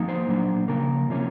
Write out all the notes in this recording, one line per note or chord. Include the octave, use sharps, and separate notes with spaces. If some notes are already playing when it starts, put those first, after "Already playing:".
Already playing: F3 A#3 D#4
C5
A#2 F#3 A#3 D4
C#3 F3 A#3 A#4
C3 F3 A#3 C#4